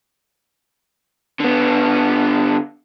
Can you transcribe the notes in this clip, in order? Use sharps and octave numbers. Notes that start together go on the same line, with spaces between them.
D3 B3